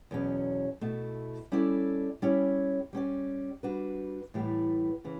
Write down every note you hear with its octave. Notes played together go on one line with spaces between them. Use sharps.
E2 B2 F#3 C#4
B2 A3 E4
G3 C#4 E4 A4 D5
G3 C#4 E4 G4 C#5
G3 C#4 G4 D5
G3 D4 F#4 B4
A2 E3 G3 B3
C#3 E3